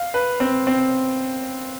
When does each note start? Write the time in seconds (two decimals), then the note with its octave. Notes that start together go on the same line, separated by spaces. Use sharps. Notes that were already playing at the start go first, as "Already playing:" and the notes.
Already playing: F5
0.14 B4
0.40 C4
0.67 C4